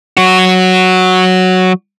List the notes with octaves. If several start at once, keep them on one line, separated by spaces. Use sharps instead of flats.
F#3 F#4